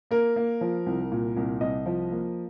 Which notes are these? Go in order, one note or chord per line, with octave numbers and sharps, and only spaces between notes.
A#3 A#4
A#3
F3
C2
A#2
C2
C2 D#5
F3
A#3